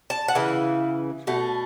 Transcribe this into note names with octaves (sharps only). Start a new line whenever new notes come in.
A5
F#5
C#3 E3
B2 A3